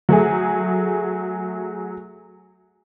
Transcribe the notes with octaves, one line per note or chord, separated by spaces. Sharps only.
F#3 A3 G#4